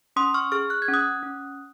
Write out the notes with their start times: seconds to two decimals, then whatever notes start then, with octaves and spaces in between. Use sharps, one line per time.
0.16 C#4 C6 D#6
0.34 C#6 F6
0.52 G#4 C#6 F6
0.70 F#6
0.82 G#6
0.88 C#4
0.94 D#6 F#6
1.23 C#4